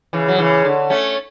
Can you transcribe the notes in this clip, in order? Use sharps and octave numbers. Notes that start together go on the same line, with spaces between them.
C#3 E3
F#3
C#3 E3
D3
A3 C#4